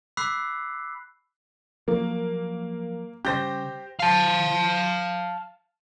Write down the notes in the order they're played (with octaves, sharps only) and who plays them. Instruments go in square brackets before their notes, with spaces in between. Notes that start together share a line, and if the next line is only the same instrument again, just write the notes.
[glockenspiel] B5 D6 E6 F#6 B6 C7
[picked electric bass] F3 F#3 [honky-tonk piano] A#3
[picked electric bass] C#3 G3 C#4 [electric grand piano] G4 C5 [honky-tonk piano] G6 A#6
[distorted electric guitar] F5 A5